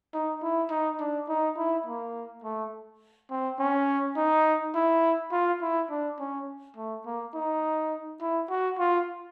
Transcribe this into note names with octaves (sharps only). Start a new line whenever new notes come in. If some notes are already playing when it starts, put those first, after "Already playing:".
D#4
E4
D#4
D4
D#4
E4
A#3
A3
C4
C#4
D#4
E4
F4
E4
D4
C#4
A3
A#3
D#4
E4
F#4
F4